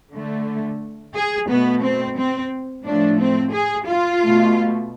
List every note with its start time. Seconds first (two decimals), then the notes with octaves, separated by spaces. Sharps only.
0.14 D3 A3
1.15 G#4
1.49 B2 A3 B3
1.84 C4
2.18 C4
2.85 A2 F3 A3 D4
3.20 C4
3.53 G#4
3.86 F4
4.21 B2 A3